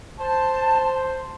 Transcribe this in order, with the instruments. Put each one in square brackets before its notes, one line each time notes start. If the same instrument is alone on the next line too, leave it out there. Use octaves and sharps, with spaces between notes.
[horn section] C5 [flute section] A5